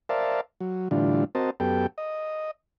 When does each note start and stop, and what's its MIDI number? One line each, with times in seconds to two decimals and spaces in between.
0.09 0.41 70
0.09 0.41 72
0.09 0.41 74
0.09 0.41 76
0.09 0.41 77
0.09 0.41 81
0.60 0.88 54
0.91 1.24 45
0.91 1.24 50
0.91 1.24 52
0.91 1.24 55
0.91 1.24 62
0.91 1.24 65
1.35 1.50 60
1.35 1.50 66
1.35 1.50 70
1.35 1.50 72
1.35 1.50 75
1.35 1.50 81
1.60 1.87 42
1.60 1.87 59
1.60 1.87 67
1.60 1.87 69
1.60 1.87 79
1.98 2.51 75